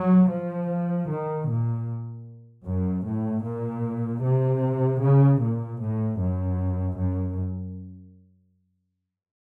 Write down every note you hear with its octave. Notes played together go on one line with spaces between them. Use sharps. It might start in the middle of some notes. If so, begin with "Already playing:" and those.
Already playing: F#3
F3
D#3
A#2
F#2
A2
A#2
C3
C#3
A#2
A2
F#2
F#2